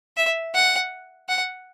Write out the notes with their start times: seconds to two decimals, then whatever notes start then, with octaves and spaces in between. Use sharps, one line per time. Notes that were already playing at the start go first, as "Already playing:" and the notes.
0.17 E5
0.54 F#5
1.29 F#5